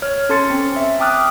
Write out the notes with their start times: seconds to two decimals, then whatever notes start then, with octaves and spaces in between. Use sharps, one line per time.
0.02 C#5 F6
0.29 C#4 A4 A5 C6 A6 C#7
0.50 C4
0.76 E5
1.00 G5 A5 D6 D#6 F6 F#6